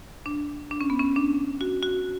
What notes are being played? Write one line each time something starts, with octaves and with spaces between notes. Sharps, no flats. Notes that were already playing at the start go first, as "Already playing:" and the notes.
D4
D4
C#4
B3
C#4
D4
F#4
F#4